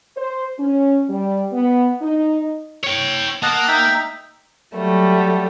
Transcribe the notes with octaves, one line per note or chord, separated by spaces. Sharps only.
C5
C#4
G3
B3
D#4
C#5 G5
A#3 D#5 F#5 A5
D#4 E5 G5
F#3 G3 A3